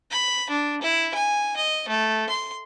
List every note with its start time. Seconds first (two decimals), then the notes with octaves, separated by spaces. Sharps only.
0.11 B5
0.50 D4
0.82 E4
1.14 G#5
1.57 D#5
1.89 A3
2.29 C6